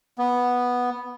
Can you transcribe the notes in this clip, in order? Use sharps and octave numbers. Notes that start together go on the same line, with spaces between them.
B3